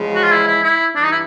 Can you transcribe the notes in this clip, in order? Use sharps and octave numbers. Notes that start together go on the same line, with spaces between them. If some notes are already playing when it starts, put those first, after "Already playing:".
Already playing: E2 C#3 F3 G#3
F#4
F4
E4
E4
E4
G2 E3 D4
D#4
E4